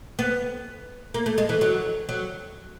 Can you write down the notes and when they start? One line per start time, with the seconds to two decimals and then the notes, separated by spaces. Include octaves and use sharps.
0.19 B3
1.14 A#3
1.26 A3
1.38 G#3
1.49 E3
1.61 F#3
2.09 F#3